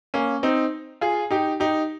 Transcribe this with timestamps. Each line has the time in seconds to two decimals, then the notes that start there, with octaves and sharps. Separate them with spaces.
0.14 A#3 C#4
0.43 C4 D#4
1.01 F4 G#4
1.31 D#4 G4
1.60 D#4 G4